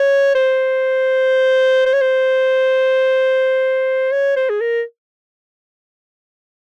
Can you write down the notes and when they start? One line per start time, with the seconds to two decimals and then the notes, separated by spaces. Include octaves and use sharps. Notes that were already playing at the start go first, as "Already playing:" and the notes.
Already playing: C#5
0.35 C5
1.86 C5
1.94 C#5
2.01 C5
4.12 C#5
4.36 C5
4.50 G#4
4.61 A#4